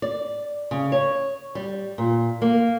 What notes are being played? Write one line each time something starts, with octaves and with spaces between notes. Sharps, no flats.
D5
C#3
C#5
G3
A#2
A#3